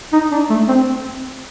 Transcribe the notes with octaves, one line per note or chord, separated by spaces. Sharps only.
D#4
D4
A3
C4